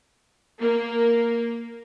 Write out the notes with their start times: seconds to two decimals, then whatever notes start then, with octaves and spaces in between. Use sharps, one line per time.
0.59 A#3